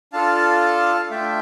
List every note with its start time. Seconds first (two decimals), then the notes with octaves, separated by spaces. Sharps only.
0.13 D4 F4 A4 F5 A5
1.11 A3 D4 F4 E5 G5